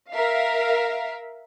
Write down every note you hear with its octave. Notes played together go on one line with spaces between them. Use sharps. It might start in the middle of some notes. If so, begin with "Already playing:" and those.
A#4 E5 F5